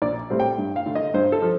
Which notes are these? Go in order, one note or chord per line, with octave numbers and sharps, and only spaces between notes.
A#1 D5
A2 G3 C4
G5
G2
F5
D3 A3
D#5
G2 C5
A4
F3